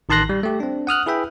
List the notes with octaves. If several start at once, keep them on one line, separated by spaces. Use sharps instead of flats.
A1 D#3 A5 C6 F#6 A#6
G3
A3 G4
C4 D4
F#5 D#6 F6 F#6
E4 G#4 B4 E5 G5